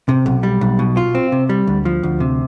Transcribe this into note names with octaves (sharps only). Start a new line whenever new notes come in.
C3
B1
G3
B1
B2
F4
C4
C3
G3
D2
F3
D2
C3